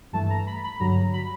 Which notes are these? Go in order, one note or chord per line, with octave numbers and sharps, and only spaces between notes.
G2 E3 A3 A5
A#5
B5
B5
G2 D3 F#3 A#5
B5